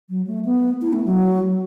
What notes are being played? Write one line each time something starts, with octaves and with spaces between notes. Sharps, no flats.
F#3
A3
B3
E4
A3
F#3